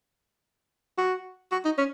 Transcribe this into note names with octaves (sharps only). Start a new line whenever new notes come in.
F#4
F#4
D#4
C#4